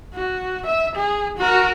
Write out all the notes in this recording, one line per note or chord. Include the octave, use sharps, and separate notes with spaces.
F#4
E5
G#4
F#4 A#4